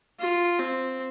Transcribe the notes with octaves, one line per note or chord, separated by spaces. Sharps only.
F4
C4